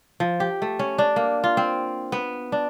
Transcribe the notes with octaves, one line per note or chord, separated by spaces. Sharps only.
F3
G4
A3
C#4
D4
A#3
F4
C4
B3
D4